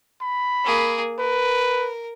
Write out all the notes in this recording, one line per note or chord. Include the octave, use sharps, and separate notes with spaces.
B5
A#3 G#4
A#4 B4